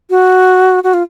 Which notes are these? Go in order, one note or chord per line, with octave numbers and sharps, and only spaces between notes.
F#4
F#4
F4